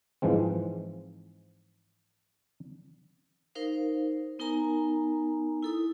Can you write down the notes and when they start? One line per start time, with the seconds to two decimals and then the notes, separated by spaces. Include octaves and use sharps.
0.22 G#2 E3 F3 G#3 C4
3.55 D#4 A#4 C5 F5
4.39 B3 D#4 A#4 G#5 A#5
5.63 E4 A4 D#6